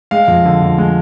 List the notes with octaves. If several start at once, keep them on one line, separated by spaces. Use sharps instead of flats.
G#3 F5
F2
D3
F2
G#3